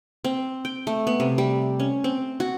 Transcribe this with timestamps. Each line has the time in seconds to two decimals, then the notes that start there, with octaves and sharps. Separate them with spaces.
0.24 C4
0.65 G5
0.87 A3
1.07 B3
1.20 C3
1.38 G3
1.80 C#4
2.04 C4
2.40 F#4